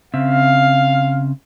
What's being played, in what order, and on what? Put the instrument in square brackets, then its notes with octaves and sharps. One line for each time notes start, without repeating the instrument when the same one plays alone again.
[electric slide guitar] C#3 C4 E5 [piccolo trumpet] F5